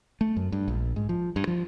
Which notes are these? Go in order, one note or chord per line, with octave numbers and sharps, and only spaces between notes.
A3
F#2
G2
A#1
G#2
F3
G2
F3